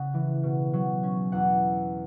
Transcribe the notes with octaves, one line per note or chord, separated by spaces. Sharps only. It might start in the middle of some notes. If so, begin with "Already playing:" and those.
Already playing: C#3 F#5
E3
B2
F#3
C#4
E2 F#5